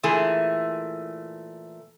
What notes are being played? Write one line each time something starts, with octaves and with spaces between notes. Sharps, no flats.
A#2 E3 A3 G#4